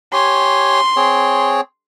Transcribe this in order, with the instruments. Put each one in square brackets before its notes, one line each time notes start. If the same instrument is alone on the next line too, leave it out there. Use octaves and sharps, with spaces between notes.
[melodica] G4 C#5 G#5 [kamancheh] C6
[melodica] C4 G#4 C#5